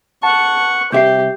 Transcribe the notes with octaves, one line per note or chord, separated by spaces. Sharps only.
F#5 A5 C#6
C2 C4 G4 E5 G6 C7